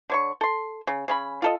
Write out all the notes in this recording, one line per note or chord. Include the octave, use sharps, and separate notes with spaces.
D3 C#5 C#6
A4 C6
C#3
C#3 C#4 B5
F4 A4 D#5